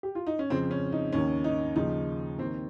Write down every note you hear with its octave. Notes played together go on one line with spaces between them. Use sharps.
G4
F4
D#4
C#4
F2 C#3 F3 C4
C#4
D#4
D#2 D#3 C#4
D#4
D#2 C#3 F3 D#4
D#2 D#3 C4